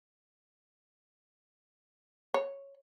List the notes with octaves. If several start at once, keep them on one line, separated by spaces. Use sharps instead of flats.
C#5